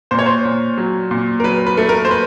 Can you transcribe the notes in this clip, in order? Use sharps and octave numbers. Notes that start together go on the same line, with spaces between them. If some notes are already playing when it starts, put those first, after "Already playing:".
A#2 C5
C#5
C5
A#2
F#3
A#2
A#4
F#3 B4
B4
A3
A#4
C5
B4